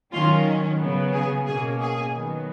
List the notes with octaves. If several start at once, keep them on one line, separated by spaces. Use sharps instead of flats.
D#3 F#3 C#4 F4
C#3 F#3 B3
G#4
B2 A#3 C#4 G#4
G#4
D#3 F#3 B3